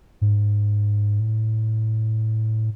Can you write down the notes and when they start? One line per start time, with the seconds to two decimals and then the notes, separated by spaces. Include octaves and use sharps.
0.21 G#2
1.20 A2